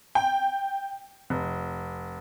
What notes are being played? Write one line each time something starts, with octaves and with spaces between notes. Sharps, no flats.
G5
F1